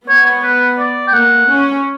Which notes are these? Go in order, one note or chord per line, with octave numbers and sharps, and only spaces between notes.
B3 C#5
C#5
B4
D5
G5
A#3 F#5
C#4